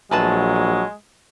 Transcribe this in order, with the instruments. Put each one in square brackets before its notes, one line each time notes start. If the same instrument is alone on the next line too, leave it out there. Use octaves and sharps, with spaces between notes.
[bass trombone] A#1 [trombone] F#3 [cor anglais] G#3 [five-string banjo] A3 B4 A5